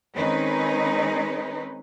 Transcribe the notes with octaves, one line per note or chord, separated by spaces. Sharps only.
D#3 G#3 C4 C#4 D#4 B4